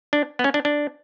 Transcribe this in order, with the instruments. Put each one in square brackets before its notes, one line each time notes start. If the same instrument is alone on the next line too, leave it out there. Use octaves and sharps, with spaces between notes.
[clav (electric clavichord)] D4
B3
C#4
D4
D4